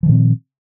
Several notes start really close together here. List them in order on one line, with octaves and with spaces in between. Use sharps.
F3 D#3 A#2 C4